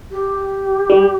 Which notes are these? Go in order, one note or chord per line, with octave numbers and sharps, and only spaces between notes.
G4
G3